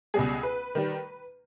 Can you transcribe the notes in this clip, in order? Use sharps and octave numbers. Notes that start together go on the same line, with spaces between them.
C#2 B2 G3 G#4
B4
D#3 G3